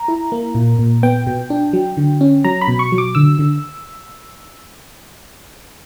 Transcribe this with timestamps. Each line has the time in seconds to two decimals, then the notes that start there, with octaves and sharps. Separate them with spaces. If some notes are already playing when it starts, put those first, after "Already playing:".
Already playing: A#5
0.08 E4
0.32 A#3
0.55 A#2
0.79 A#2
1.03 B3 G5
1.27 B2
1.50 D4
1.73 F#3
1.97 D3
2.21 C#4
2.44 F#3 A#5
2.62 B5
2.68 B2
2.79 C#6
2.92 F#3
2.98 D6
3.15 D3 E6
3.39 D3